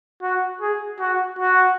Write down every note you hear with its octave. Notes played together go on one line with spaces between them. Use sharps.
F#4
G#4
F#4
F#4